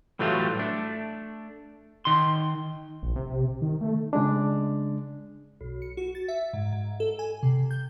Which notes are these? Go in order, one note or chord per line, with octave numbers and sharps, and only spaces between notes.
A2 E3 F#3 G3 A3 F4
A3 D4
D#3 C6
A#1
C3
D#3
A3
C#3 G#3 D4
B1
C#7
F#4
A6
E5
G#2
G#2
A4
G#5
C3
G6